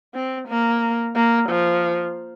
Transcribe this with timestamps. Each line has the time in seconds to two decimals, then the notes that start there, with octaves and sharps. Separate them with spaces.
0.14 C4
0.48 A#3
1.15 A#3
1.49 F3